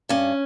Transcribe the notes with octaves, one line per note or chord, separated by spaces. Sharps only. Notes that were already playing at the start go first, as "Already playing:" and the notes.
G2 C#4